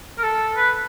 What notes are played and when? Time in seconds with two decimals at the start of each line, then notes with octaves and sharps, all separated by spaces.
0.18 A#4
0.23 A4
0.57 B4